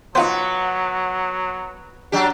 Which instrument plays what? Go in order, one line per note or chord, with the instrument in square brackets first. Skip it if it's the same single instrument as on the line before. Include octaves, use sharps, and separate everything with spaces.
[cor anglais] F#3 [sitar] B3 [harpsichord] D#4 F4 C5
[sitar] F#3 D4 G4